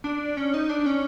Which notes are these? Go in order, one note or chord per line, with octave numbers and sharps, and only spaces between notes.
D4
C#4
D#4
D4
C#4